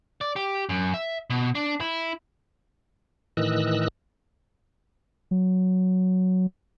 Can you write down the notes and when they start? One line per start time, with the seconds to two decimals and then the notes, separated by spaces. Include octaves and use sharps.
0.21 D5
0.36 G4
0.69 F#2
0.94 E5
1.30 B2
1.55 D4
1.81 E4
3.37 A2 D#3 E3 D#5 E6 F#6
5.31 F#3